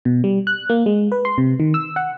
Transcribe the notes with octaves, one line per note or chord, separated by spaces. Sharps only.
B2
G3
F#6
A#3
G#3
B4
C6
C3
D#3
E6
F#5